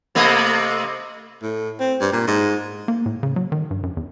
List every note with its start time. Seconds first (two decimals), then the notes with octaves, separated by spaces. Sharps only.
0.15 C3 A3 D#5
1.42 A2
1.80 C4
2.00 G2
2.12 A#2
2.27 G#2
2.88 A#3
3.06 A2
3.23 C#3
3.36 F#3
3.52 D#3
3.71 G2
3.83 F#2
3.97 E2